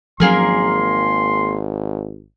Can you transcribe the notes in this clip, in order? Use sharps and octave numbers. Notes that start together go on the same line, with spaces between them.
G#1 F3 F#3 A#3 C#4 G#4 A#4 C6